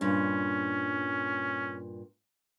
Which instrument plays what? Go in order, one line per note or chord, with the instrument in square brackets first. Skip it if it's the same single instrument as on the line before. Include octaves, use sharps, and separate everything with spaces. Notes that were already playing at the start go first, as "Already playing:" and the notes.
[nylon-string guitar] G2 A#2 [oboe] C#4